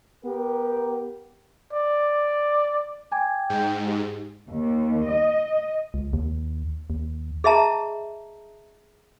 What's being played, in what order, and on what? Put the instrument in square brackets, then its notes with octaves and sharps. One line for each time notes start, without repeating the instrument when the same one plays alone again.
[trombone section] B3 G4 A#4
[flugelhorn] D5
[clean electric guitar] G5 [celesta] G#5 D6 G#6
[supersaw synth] G#2 [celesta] G6
[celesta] G4
[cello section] D#2
D#5
[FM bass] C#2
D#2
D#2
[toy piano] G#4 D#5 E5 A5 A#5